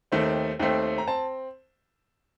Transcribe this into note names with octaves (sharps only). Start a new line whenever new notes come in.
D#2 D#3 A3 C4
D#2 D#3 A3 C4
A#5
C4 A5